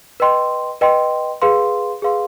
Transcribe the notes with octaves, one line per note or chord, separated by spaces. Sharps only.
B4 D#5 G5 C6
B4 D#5 G5 C6
G#4 B4 F5 C6
G#4 B4 F5 C6